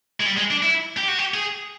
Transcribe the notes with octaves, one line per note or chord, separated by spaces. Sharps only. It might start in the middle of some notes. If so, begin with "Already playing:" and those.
G#3
G3
G#3
D4
E4
G4
F#4
G4
G#4